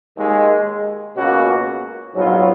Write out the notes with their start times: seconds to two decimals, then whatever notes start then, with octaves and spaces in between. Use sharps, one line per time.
0.17 D#2 D#3 G#3
1.16 C#2 B2 A#3 C#4 F#4
2.13 A#1 G#2 F#3 B3 F4